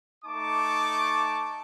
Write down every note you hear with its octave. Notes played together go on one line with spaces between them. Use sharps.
A3 D#4 A5 C#6 D6